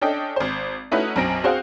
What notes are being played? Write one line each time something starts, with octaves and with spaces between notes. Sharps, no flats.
C#4 D4 A4 D#5 G5
G#1 C5
A3 C#4 D#4 E4 F#4 B4
B1 F#2 C4 A#6 D7
C4 F#4 G#4 C5 F5